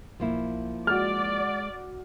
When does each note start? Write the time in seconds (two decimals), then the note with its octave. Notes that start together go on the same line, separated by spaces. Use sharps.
0.20 B1 F3 A#3 E4
0.87 G#3 F#4 D5 F6